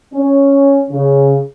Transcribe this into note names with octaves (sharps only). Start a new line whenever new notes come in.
C#4
C#3